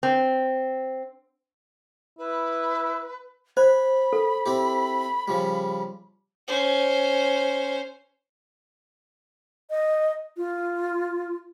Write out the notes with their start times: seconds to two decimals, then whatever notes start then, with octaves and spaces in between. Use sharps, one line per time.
0.03 C4
2.18 E4 B4
3.57 C5 G#5 B5
4.13 A4
4.46 C4 E4 G4
5.28 C#3 F3 G3
6.47 C#4 C5
9.70 D#5
10.37 F4